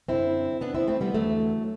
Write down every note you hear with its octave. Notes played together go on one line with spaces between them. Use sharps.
F#2 D3 C4 E4
B3 D4
C4 E4
A3 C4
G3 B3
E2 D3 F#3 A3